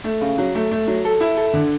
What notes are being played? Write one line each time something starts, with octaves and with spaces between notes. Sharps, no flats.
A3
C#3
F#3
A3
A3
F#3
A4
E4
A4
D3